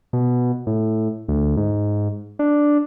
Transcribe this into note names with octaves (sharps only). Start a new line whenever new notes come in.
B2
A2
D2
G#2
D4